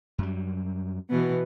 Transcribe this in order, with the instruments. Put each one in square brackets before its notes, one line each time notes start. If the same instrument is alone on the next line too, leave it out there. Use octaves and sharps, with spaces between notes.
[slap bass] F#2 F#3 G3
[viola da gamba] B2 E3 B3